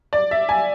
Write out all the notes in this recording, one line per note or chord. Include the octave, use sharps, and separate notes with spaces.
D5
E5
G#5